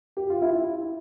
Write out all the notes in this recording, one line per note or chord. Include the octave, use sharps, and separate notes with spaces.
G4
F4
E4
E4